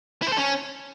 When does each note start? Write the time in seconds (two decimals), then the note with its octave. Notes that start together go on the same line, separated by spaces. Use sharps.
0.22 E4
0.27 C5
0.32 A4
0.38 C#4